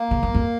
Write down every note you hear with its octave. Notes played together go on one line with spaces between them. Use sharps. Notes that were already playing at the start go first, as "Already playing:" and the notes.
Already playing: A#3
C#3
F#2
F2